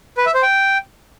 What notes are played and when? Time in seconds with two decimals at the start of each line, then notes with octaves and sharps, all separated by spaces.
0.17 B4
0.26 E5
0.34 C5
0.43 G5